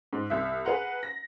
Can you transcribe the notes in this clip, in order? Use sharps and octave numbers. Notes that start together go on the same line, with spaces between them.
G#2
C2 E5
G#4 B4 F5 F#5 A#5
A#6